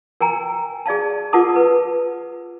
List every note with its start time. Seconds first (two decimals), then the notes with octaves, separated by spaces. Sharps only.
0.21 A#4 G5 G#5 A#5
0.86 G#4 D5 F5 A5
1.33 F4 A#4 F#5 A5 D6 D#6
1.56 B4